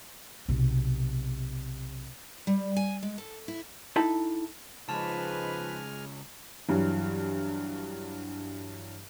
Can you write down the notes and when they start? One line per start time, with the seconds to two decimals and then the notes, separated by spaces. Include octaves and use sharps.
0.49 B1 C3
2.47 G3
2.77 G#5
3.03 G#3
3.18 A4
3.48 E4
3.96 D#4 E4 A4 A5
4.89 C#2 F3 G#3 D#4 B4 G#5 A5 F6
6.68 G2 E3 F#3